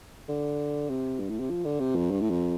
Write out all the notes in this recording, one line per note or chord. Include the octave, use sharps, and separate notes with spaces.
D3
C3
G2
A2
C3
F3
D3
C3
F2
G2
A2
F2